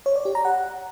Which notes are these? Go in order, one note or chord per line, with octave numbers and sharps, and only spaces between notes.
C#5
D5
G4
A#5
F#5